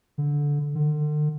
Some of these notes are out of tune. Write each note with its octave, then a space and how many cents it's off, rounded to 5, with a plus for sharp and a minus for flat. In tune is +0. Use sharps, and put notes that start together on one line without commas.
D3 -15
D3 +40